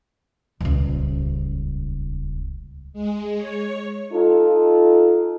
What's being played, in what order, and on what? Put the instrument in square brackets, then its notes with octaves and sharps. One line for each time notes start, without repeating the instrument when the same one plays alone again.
[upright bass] D#1 C#2
[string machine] G#3
C#5
[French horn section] D#4 F4 A4